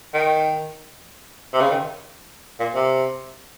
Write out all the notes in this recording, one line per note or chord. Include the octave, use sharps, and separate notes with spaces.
D#3
C3
C#3
D#3
A#2
C3